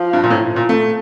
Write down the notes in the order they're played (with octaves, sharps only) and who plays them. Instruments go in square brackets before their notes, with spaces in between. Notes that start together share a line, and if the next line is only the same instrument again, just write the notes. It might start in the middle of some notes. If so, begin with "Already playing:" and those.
Already playing: [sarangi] F3
[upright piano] G2
A#2
A2
A#2
A3